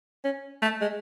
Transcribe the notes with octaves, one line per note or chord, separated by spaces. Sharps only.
C#4
A3
G#3